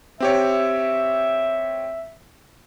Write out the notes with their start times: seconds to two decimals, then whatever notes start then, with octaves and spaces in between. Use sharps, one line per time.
0.20 C4 G4 C#5 E5